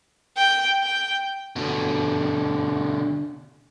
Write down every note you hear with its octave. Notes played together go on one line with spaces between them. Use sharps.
G5
G5
B2 D3